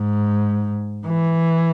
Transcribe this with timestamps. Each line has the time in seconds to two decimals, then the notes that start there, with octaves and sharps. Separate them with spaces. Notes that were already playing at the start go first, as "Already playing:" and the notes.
Already playing: G#2
1.06 E3